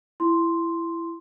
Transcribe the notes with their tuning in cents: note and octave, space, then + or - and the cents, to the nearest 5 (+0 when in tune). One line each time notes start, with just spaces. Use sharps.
E4 +20 C6 +0